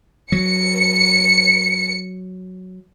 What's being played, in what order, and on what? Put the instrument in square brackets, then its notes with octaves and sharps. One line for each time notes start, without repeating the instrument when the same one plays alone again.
[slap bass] F#3 [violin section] C#7